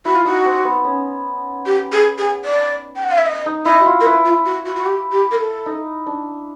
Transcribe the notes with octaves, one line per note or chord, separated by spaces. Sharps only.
E4 F#4
F4
D#4 F#4
C4
B3
C#4
G4
G#4
G#4
D5
G5
F#5
F5
E5
D#5
D#4
E4 D#5
F#4
F4
A#4
E4 B4
F4
F#4
F#4
F#4
G4
G4
A#4
A4
D#4
D4